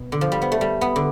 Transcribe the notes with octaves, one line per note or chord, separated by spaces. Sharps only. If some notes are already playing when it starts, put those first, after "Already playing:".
Already playing: B2
D3
F3
G3
B3
A3
G3
B3
D3